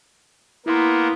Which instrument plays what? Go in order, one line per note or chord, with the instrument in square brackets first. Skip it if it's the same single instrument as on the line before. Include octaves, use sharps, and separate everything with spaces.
[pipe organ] A#3 B3 [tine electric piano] E4 F5 C6